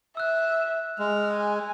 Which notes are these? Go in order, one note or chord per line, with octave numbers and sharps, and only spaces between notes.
E5 E6 F#6
G#3 F6
G#5